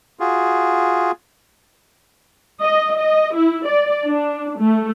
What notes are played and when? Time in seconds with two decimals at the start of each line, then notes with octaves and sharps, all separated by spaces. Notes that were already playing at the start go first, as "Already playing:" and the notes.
0.20 F4 F#4 G#4
2.60 D#5
2.98 D#5
3.35 E4
3.67 D5
4.06 D4
4.60 A3